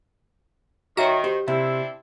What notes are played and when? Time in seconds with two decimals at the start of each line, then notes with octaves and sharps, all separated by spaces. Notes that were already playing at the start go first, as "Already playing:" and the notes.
0.97 D#3 F#4 C#5 E5 A#5
1.24 G4 C5
1.48 C3 C4 D4 E4 E5 E6